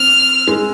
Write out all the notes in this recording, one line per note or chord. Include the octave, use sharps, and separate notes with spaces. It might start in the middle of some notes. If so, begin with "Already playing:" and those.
Already playing: C4 F6
G#3